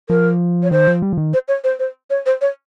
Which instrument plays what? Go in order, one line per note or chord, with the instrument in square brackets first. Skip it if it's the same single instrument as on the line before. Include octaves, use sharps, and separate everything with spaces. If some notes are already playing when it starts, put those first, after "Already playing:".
[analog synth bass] F3 [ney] A#4
[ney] C#5
[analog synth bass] D#3 [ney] C5
[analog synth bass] F3
G3
F3
D#3
[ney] C5
C#5
C5
C5
C#5
C5
C#5